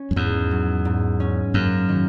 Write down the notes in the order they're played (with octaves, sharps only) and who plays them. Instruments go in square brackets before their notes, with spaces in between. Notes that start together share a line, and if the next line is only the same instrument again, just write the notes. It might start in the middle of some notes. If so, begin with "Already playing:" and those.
Already playing: [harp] C#4
[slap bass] F#2
[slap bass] E2 [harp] G#2
[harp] F#3
G#2
C#4
[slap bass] F#2 [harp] A#3
[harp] D#3